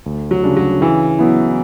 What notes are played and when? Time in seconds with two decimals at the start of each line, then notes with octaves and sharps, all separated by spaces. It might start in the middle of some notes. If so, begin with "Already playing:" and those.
0.06 D2
0.31 F#3
0.43 C#3 G3 D4
0.57 F#3
0.81 C#3 E3
1.19 F#3 B3 E4